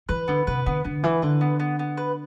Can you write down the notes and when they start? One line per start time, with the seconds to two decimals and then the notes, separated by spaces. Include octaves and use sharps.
0.09 E3 B4
0.28 D3 B3
0.47 C3 B4
0.66 D3 B3
0.85 D3 B3
1.03 E3 B4
1.22 D3 B4
1.41 B3
1.60 B3
1.79 B3
1.97 B4